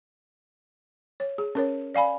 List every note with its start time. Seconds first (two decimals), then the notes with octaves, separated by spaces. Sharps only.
1.20 C#5
1.38 G#4
1.55 C#4 A#4 C#5
1.95 D5 F5 G#5 B5